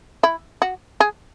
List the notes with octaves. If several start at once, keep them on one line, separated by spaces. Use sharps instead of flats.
E4
F#4
G#4